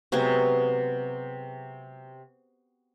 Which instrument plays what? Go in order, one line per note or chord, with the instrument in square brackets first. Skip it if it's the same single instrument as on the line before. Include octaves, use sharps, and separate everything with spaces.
[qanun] C3 F#3 G#3 B3